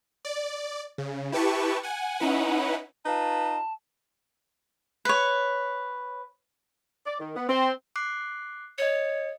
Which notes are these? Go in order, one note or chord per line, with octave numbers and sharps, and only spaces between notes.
D5
C#3
E4 G4 B4 A5 C#6
F#5 G#5
C#4 D#4 E4 B4 F#5
D#4 F4 B4 A5
B4 C#5
D5
D#3
B3
C4
D6 F#6 C7
C#5 D#5 C#7